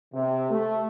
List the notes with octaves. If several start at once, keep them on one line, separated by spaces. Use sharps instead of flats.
C3
A3